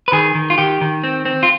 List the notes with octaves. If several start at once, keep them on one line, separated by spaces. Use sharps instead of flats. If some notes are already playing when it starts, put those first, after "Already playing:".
B4
D#3 G#4
D#3
F4
D#3 G4
D#3
C4
C4
F4